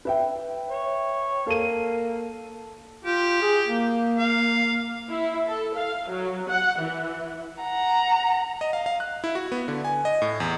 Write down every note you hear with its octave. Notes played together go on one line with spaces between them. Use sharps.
B4 E5 G5
C#5
A#3 A4 D#7
F4 G4
G#4
A#3
F5
E4
A4
F5
F#3
F#5
E3
F#5 A#5
D#5
F5
F5
F#6
E4
F#4
B3
D3
G#5
D#5
A2
E2